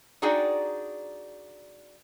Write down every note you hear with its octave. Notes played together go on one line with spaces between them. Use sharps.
D4 D#4 F#4 G#4 D5 G5